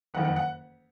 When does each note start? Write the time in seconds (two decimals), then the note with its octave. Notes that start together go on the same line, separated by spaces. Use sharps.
0.14 F#1 F2 D#3 F#5
0.25 F#5
0.36 F#5